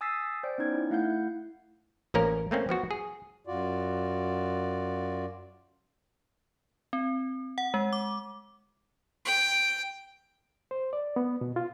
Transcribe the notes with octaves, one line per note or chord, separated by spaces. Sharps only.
G#5 D#6 E6 A6 B6 C7
C5 D5 G5
B3 C#4 D#4 G#6
D#4 E4
A3 E4 F5 F#5 G6
A1 F3 A#3 C#4 A#4
A3 A#3 C4 C#4
F3 B3 F#4
G#4
F#2 F4 F#4 D5
C4
F#5
G#3
D6
G5
C5
D5
B3
B2
F4